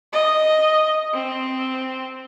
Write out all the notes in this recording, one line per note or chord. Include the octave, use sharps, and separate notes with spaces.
D#5
C4